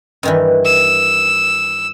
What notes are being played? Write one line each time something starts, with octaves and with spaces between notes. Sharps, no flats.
G2 D#3 E3
E6